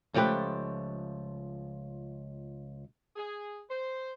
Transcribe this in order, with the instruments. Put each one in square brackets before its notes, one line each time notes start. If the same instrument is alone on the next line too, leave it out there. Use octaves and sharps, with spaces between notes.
[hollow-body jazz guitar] C#2 F3 A3 G4 B4
[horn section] G#4
C5